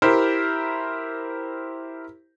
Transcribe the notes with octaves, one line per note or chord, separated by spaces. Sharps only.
E4 G4 A#4 C5